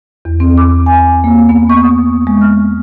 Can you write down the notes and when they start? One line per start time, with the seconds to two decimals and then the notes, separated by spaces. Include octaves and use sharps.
0.25 E2
0.40 C4
0.58 D6
0.86 G#5
1.24 A#3
1.49 B3
1.69 C#6
1.83 D#6
2.27 G#3
2.41 F6